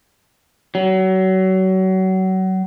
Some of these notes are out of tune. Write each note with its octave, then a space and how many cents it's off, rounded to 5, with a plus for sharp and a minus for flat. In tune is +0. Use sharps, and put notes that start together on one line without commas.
F#3 +30